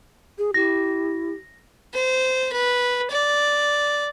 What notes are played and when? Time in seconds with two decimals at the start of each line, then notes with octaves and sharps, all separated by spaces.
0.38 G#4
0.54 E4 G4 A#6
1.94 C5
2.52 B4
3.11 D5